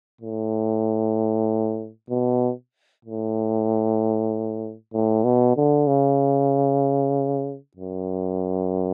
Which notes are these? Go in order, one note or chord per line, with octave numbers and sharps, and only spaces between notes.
A2
B2
A2
A2
B2
D3
C#3
F#2